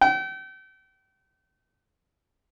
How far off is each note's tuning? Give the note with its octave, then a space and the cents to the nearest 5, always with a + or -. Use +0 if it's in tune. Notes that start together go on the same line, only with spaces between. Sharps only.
G5 -40